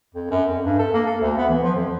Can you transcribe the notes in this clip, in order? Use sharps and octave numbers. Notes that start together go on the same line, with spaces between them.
F2
F#2
F2
G2
A4
A#3
A4
D2
B3
E3
F3
F2